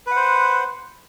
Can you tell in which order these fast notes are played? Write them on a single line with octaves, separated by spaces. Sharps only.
B4 F#5 C5